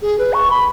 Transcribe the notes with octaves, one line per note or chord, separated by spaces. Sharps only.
G#4
B4
C#6
B5